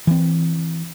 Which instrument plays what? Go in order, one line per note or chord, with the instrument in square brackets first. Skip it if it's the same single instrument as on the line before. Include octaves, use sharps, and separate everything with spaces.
[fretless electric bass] E3 C4